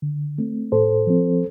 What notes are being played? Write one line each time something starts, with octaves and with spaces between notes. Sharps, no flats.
D3
A3 C4
A2 A4 C5
F3 C4